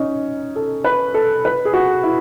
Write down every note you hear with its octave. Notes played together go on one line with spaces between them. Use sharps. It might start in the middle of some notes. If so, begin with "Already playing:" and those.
Already playing: C#4 D#4
A4
B4
A4
B4
G#4
F#4
E4